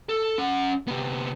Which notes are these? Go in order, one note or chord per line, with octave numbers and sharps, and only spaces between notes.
A4
C#4 F#5
C3 B3